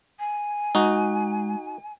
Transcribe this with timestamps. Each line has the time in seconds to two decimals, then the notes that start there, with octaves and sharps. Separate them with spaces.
0.19 G#5
0.75 G#3 D#4 F#4